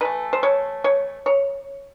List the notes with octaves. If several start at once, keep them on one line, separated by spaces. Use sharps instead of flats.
E3 A3 B4
C5
C#5
C#5
C#5